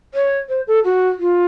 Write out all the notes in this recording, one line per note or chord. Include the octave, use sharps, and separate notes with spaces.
C#5
C5
A4
F#4
F4